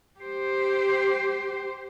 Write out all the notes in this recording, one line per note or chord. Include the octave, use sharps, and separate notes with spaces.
G4 C5